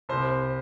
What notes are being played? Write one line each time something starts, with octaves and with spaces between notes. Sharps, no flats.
C2 C5